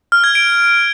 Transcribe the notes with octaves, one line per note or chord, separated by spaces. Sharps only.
F6
G#6
D7